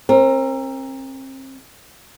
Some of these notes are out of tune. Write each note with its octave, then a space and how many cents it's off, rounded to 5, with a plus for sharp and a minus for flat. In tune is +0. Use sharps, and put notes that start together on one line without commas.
C4 +35 A#4 +0